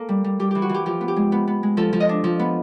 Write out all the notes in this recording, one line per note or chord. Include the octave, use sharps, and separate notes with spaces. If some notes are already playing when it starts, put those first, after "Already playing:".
Already playing: A#3 A4
G3
G3
G3 G4
E3 G4
F#4
E3
G4
F3 G4
B3
G4
G#3
B3
B3
G#3
F3 A4
F3
D#5
D4
F3
B3